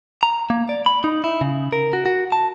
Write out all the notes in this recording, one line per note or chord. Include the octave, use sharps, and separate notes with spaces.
A#5
A#3
D5
B5
D#4
E4
C#3
A#4
F#4
F#4
A5